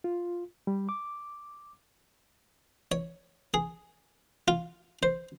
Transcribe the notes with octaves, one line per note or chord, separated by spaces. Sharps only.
F4
G3
D6
C#5
G#4
F4
C5